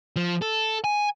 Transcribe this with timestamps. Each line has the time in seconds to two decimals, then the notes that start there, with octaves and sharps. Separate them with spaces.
0.16 F3
0.42 A4
0.84 G#5